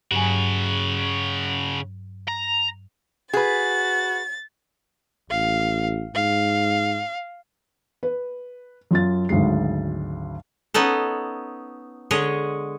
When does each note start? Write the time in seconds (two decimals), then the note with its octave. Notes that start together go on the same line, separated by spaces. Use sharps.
0.11 G2 C#3 F#3 F#4 G#5
2.28 A#5
3.33 F#4 G#4 B4 A6
5.30 A1 F5
6.15 G#2 F5
8.03 B4
8.91 F#2 F4 A6
9.29 G#1 D2 F#3 G#3 C7
10.74 B3 C#4 D#4 A4
12.11 D3 G#3 C#5 D#5